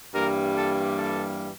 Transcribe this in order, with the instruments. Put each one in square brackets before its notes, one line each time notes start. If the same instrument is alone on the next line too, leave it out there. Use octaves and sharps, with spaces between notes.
[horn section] G2 E3 G3 A#3 A#4
A4
A4